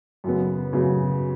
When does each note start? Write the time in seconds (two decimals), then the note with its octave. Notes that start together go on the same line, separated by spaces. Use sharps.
0.24 F#2 C#3 F#3 B3
0.73 F#2 C#3 F#3 B3